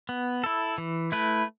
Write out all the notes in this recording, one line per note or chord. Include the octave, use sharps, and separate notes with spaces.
B3
E4 A4
E3
A3 E4 B4